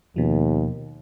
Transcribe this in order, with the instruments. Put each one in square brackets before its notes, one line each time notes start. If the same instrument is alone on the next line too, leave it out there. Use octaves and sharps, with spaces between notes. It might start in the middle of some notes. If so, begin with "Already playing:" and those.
[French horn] D#2 [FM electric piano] B2 F3